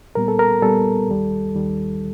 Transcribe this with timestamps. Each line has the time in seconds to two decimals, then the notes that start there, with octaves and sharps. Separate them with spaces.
0.15 A#2 G3 B3 A#4
0.28 A4
0.39 A#4
0.62 A#2 G3 B3 A4
1.08 D#2 D#3 G3
1.55 D#2 D#3 G3